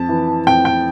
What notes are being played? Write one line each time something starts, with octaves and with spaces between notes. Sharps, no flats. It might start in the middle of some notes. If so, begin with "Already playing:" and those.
Already playing: F2 A5
E3
F2 G5
G5